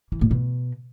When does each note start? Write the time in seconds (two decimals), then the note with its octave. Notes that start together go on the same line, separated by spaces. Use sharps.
0.12 E3
0.21 A#2
0.31 B2